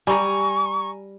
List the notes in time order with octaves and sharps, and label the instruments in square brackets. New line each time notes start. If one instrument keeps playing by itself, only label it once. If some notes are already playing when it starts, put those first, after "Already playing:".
[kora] G3 [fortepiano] G#5 A#5 [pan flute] C#6